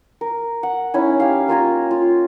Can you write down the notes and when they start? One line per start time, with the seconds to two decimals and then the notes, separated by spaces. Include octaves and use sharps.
0.21 A#4
0.63 F#5
0.94 C#4 D#4 E4 G#5
1.20 G4 F5
1.48 A#3 F4 G#5 A#5
1.91 F4